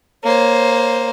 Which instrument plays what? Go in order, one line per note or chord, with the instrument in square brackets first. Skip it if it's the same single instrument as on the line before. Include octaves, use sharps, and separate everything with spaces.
[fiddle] A#3 C5 [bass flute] C#5